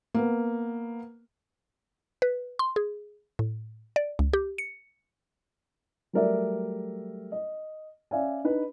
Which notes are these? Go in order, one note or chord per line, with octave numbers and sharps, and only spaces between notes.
A#3 B3
B4
C6
G#4
A2
D5
C#2
G4
C#7
F#3 G3 A3 A#4 D5 E5
D#5
C#4 D5 E5 F5 G#5
D4 D#4 B4 B5